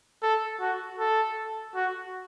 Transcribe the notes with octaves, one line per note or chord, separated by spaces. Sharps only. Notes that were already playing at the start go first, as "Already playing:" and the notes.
A4
F#4
A4
F#4